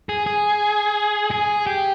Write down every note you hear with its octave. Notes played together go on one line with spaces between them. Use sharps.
G#4
G#4
G#4
G4